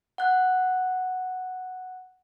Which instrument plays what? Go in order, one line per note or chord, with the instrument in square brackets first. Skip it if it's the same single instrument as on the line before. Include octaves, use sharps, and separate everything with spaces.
[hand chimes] F#5 F#6